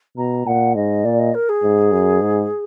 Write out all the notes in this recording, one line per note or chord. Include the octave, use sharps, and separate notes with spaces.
B2 A#5
A#2 F#5
G#2 D#5
A#2 D5
D#5
A#4
G#4
G#2
F#2
G#2